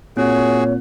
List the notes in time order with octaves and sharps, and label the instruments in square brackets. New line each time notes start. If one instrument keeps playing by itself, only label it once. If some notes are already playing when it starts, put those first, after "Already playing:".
[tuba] A#2 [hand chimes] C4 [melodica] F#4 G#4 [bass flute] C#5